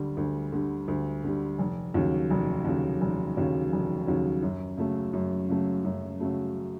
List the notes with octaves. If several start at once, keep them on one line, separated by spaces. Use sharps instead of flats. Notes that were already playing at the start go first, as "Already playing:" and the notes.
Already playing: D2 D3 G3
D2
D3 G3
D2
D3 G3
F1
D#2 C#3 F#3
F1
D#2 C#3 F#3
F1
D#2 C#3 F#3
F1
D#2 C#3 F#3
F#2
C#3 F#3 A3
F#2
C#3 F#3 A3
F#2
C#3 F#3 A3